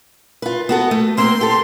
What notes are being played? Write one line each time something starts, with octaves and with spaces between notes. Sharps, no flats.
F4 B4
B3 F#4 A4
A3
A#3 C4 C6
G4 A4